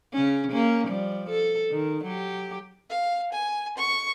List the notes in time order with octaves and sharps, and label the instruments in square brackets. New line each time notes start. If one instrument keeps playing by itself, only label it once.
[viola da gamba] C#3 C#4
A#3 C#4
F3 G3
A4
D#3
F#3 G4
[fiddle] F5
G#5
C#6